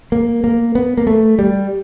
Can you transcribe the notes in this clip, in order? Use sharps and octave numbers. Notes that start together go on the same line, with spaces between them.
A#3
A#3
B3
A#3
A3
G3